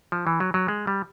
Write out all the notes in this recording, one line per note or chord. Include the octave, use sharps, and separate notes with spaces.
F3
E3
F#3
F#3
G#3
G3